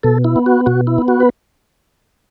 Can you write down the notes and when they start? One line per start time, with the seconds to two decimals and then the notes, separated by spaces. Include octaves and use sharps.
0.03 B2 A4
0.24 E4
0.36 B3
0.46 F#4
0.66 B2 F#4
0.87 E4
0.98 B3
1.08 F#4
1.20 B4